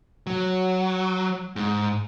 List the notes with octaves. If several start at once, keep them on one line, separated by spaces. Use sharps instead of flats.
F#3
G#2